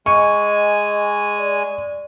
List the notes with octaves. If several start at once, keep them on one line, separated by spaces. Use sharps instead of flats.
G#3 D#5 G#5 C#6
D5